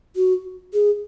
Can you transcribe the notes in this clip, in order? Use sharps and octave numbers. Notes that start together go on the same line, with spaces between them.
F#4
G#4